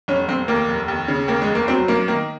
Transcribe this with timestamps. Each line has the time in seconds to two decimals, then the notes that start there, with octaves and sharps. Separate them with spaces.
0.08 F1 C#4
0.28 F1 C4
0.48 D#2 A#3
0.68 F1
0.88 D#2
1.08 C#3
1.28 D#2 A#3
1.42 G#3
1.48 F1
1.55 A#3
1.68 F#3 C4
1.88 F#2 A#3
2.08 D#3 A#3